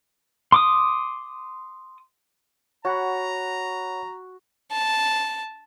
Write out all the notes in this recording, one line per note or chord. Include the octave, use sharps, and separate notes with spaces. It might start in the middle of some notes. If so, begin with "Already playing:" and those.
C6 D6 D#6
F#4 C#5 F#5 A#5 B5
A5